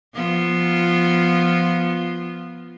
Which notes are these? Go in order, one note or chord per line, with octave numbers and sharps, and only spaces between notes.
F3 B3 F4